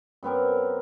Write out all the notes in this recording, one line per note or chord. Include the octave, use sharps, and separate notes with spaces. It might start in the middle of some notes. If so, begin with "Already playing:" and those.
F#2 B3 C4 A#4